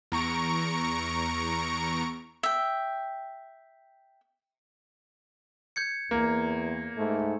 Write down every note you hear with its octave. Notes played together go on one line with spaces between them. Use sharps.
E2 A#5 C#6 D7
E5 G5
G6 G#6 C#7
E2 A#3
G#2 A3